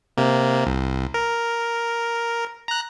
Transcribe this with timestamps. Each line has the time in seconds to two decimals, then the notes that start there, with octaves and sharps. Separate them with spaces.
0.17 C3 A#3
0.66 C2
1.14 A#4
2.68 A#5 F#6